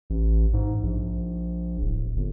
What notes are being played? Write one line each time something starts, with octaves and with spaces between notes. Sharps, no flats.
A1
G#2
A#1
D1
G1